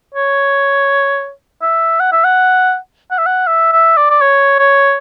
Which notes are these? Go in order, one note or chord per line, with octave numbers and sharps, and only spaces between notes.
C#5
E5
F#5
E5
F#5
F#5
E5
F#5
E5
E5
D5
D5
C#5
C#5